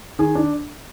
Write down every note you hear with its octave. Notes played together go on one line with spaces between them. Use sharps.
D#3 G#4
D4